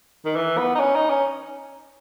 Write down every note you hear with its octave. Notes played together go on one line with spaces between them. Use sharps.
D#3
E3
B3
D#4
C#4
D#4
C#4